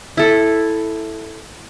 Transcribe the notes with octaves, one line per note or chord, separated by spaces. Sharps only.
E4 A4